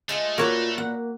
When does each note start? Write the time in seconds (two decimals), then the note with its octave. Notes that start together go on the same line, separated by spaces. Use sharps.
0.09 G#3 A3 F4 G#4
0.38 A#2 A#3 F4 F#4 B4 C#5 A#5
0.78 A#3 F#5